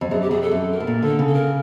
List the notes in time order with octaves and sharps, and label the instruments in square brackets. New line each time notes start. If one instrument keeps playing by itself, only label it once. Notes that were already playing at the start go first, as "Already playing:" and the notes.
[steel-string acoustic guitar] F2
[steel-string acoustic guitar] F#2 [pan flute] G#4
[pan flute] G4
[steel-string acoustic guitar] F2 [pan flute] G#4
[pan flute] A4
[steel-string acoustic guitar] F#2
[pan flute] A#4
[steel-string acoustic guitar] A2
A#2
[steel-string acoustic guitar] D3 [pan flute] A4
[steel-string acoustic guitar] C#3
[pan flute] A4
A#4